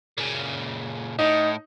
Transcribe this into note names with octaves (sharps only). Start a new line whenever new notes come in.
A#2 C#3
A2 D#4